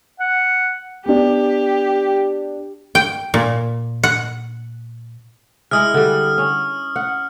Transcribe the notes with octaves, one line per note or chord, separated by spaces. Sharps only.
F#5
B3 D4 G4
G5
A#2
F#5
G#3 E4 G#4 D#6 F6
D3 G3
C#4
F#5